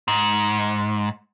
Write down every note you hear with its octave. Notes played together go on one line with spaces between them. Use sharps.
G#2